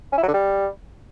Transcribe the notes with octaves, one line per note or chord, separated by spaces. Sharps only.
C#4
E4
F#3
D3
G3